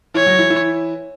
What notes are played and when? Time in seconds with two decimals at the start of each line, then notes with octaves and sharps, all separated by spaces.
0.14 E3 E4 C#5
0.26 F#3 F#4
0.39 E3 E4
0.50 E3 E4